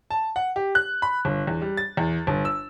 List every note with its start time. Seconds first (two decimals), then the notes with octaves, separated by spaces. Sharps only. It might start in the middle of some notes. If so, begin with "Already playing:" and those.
0.10 A5
0.36 F#5
0.56 G4
0.75 F#6
1.02 B5
1.25 G1
1.47 E2
1.62 G3
1.77 A6
1.97 E2
2.27 G1
2.45 E6